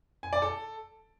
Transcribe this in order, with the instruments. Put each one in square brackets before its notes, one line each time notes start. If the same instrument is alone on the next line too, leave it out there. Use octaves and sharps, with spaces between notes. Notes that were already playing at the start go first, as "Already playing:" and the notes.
[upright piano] G#5
D5
A4